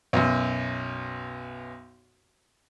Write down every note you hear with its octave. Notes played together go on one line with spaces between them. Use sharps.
B1 F#2